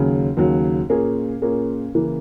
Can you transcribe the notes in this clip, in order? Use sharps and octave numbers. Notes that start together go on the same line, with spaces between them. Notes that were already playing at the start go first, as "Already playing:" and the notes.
Already playing: D#2 C#3 F#3
D#2 C#3 F#3
A#2 A#3 C#4 G#4
A#2 A#3 C#4 G#4
C#3 E3 A#3